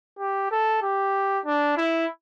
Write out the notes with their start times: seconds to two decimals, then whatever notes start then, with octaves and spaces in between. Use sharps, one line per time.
0.19 G4
0.52 A4
0.82 G4
1.46 D4
1.78 E4